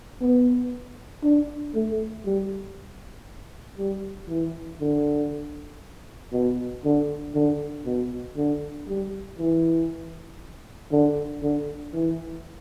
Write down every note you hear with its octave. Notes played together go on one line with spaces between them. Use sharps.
B3
D4
A3
G3
G3
E3
D3
B2
D3
D3
B2
D3
G3
E3
D3
D3
E3